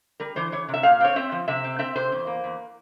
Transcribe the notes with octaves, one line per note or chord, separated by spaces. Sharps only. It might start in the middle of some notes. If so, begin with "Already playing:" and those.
G3 A#4
E3 C5
E3 C#5
C3
E5
A#2 F5
C4 C#5
C4 E5
F3
C3 E5
C4
C4 E5
C3 C5
E2
A#3
E2